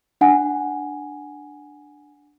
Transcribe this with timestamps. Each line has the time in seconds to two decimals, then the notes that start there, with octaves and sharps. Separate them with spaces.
0.21 D4 F#5 G#5